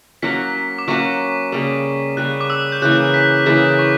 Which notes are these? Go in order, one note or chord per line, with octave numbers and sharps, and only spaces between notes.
F#3 A#3 C#4 F#4 B6
D6
F#3 A#3 C#4 F#4 C#6
C#3 G3 A#3
C#3 G3 A#3 F#6
D6
E6
G6
C#3 E3 A#3 F#6
B6
C#3 E3 A#3 D6
C#6